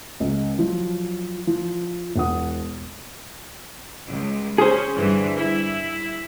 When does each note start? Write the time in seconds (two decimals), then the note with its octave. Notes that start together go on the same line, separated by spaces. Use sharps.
0.20 C#2
0.59 F3 F#3
1.47 F3
2.15 E1 F#5 D#6
4.08 C#2
4.58 C#4 G#4 C5
4.96 G2 D3 E3
5.36 E4